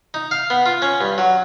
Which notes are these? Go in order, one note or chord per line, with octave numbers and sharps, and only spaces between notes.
D#4
F5
B3
F4
C#4
G2
F#3